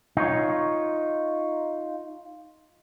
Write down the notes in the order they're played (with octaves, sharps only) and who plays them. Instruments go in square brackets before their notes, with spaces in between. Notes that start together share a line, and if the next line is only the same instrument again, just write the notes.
[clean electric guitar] D#4 F4 C#5